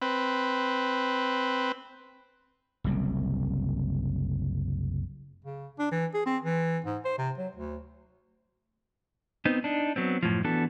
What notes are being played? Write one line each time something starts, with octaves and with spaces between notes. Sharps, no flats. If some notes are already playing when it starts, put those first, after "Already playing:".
C4 B4
F#1 C2 F#2
C#3
D4
E3
G#4
C4
E3
G#2
C5
C3
F#3
D2
B3 C4 D#4
D4 D#4
F#3 B3 C4
F#2 A2 F3
E3 B3 D4 F#4 A4